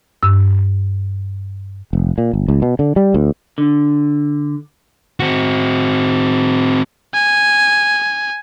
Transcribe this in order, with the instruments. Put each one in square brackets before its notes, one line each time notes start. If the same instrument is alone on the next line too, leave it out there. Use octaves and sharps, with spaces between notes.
[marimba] G2 E6
[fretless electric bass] F1
A#2
G1
C#2
B2
D3
G3
D2
[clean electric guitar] D3
[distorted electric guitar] C4 F#4
[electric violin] G#5